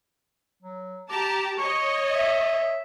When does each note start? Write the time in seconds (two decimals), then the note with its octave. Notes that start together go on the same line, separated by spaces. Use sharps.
0.62 F#3
1.09 G4 A5 A#5 D6
1.58 C#5 D#5 C#6
2.15 E5